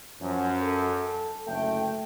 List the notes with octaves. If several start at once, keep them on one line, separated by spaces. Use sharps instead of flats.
F#2 F3
A4
F#1 D2 A3 G5